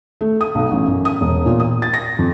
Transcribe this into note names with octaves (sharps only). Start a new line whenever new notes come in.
A3
D#6
B1
A1
F#2
D#6
E1
A#2
D#6
A6
A#6
F2